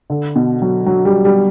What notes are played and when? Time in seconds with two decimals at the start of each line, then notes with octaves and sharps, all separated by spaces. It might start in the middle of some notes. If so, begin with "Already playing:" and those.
0.10 D3
0.36 B2
0.62 F#3
0.86 F#3
1.05 G3
1.25 G3